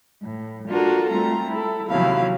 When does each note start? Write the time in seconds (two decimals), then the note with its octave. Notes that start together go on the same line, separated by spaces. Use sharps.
0.22 A2
0.68 A#3 D4 F4 F#4 A4 A#4
1.10 G3 A3 C4 F4 A#5
1.51 E4 A4
1.90 D#2 C3 F3 F#3 E4 F5